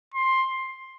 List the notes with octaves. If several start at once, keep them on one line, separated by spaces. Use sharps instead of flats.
C6